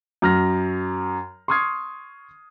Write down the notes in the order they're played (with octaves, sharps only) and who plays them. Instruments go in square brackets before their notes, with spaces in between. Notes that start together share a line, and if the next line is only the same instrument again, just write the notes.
[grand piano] F#2 F6 A#6
C6 C#6 D#6 F6 G#6 C7